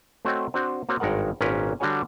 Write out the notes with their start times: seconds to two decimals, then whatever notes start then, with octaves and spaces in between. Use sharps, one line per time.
0.25 A3 C4 F#4 C#5 D#5 G5
0.54 C4 D4 F#4 C5
0.89 A#3 C4 F#4 C#5 F#5
1.00 G#1 G2 G#3 A#4 F#5
1.41 G#1 A#2 C#4 A#4 B4
1.80 D3 G3 D4 F#4 C#5 G#5